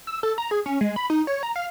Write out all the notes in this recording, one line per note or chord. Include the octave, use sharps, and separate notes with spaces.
E6
A4
A#5
G#4
C#4
G#3
B5
D#4
C#5
A#5
F5